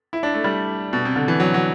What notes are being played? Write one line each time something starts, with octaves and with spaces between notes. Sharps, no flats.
E4
D4
A3
G3
B2
C3
D3
E3
F#3
F#3